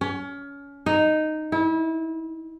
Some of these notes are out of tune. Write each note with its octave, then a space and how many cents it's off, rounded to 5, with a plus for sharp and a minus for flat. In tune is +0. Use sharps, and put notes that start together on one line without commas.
C#4 +25
D#4 -5
E4 -30